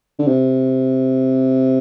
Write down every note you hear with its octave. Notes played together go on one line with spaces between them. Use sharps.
D3
C3